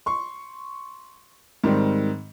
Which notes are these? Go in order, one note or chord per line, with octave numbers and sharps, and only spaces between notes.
C6 C#6
G#2 D#3 G3 C4